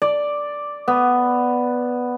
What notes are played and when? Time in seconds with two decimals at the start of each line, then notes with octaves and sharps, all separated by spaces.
0.02 D5
0.88 B3